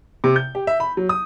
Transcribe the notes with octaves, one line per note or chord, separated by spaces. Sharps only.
C3
G6
G4
E5
B5
F#3
D#6